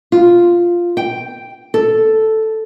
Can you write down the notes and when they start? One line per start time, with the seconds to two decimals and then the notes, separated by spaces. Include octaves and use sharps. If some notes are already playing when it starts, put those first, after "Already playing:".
0.12 F4
0.97 G5
1.74 A4